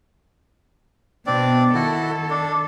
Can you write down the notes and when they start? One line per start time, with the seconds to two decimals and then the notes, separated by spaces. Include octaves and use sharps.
1.26 B2 B3 C4 D4 D5
1.75 D#3 E4 F#4 A4
2.30 D4